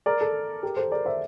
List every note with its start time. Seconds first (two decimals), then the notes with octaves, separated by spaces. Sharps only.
0.06 A#4 D5
0.21 A4
0.63 G4 A#4
0.77 A4 C5
0.92 A#4 D5
1.05 C5 E5